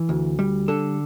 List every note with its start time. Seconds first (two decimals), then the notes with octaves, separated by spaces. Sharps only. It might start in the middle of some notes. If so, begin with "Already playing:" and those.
Already playing: E3
0.09 D2
0.39 G3
0.68 D3 A4